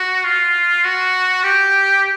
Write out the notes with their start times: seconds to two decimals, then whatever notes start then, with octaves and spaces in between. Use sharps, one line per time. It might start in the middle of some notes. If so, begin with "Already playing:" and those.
Already playing: F#4
0.24 F4
0.84 F#4
1.44 G4